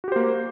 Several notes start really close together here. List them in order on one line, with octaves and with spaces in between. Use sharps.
F#4 G4 C5 A#3